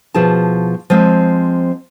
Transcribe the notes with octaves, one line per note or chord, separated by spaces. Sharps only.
B2 F3 E4 G#4 A5
F3 G#3 C4